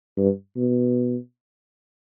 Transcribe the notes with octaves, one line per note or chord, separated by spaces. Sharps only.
G2
B2